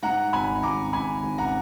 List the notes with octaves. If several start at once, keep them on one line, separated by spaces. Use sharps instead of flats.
G#2 F#5 A#5
G#1 G#5 B5
G#1 A#5 D6
G#2 G#5 B5
G#1
F#5 A#5